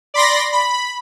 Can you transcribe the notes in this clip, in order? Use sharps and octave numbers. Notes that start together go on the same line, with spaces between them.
D5 B5 C6 A#6
B5